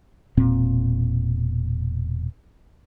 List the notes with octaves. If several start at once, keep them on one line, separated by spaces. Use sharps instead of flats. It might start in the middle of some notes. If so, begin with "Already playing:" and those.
E1 A#2 C4